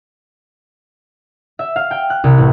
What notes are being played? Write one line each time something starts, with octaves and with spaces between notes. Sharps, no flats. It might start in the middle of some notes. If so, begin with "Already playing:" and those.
E5
F5
G5
F#6
C2
A1